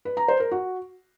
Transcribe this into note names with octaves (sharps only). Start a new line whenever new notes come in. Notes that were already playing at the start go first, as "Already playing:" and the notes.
B4
A#5
C5
A#4
F#4